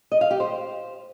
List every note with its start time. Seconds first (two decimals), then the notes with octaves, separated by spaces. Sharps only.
0.12 D#5
0.21 F5
0.31 G4
0.40 C5